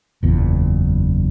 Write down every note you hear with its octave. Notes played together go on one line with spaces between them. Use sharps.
F#1 E2 A#2